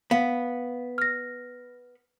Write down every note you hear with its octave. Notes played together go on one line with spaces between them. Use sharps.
B3 F5
F6 A#6